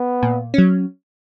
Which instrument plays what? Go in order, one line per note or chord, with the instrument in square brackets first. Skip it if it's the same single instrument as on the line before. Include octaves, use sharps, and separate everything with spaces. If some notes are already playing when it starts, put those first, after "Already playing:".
Already playing: [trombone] B3
[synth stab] A#2
F#3 C#4